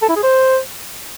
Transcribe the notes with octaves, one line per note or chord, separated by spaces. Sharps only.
A4
E4
G#4
C5